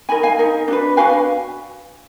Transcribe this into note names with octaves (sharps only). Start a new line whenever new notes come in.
D#4 A#4 G#5 B5
F5 G#5
D#4 A#4
D4 F#4 B4
D4 F#4 B4 F5 G#5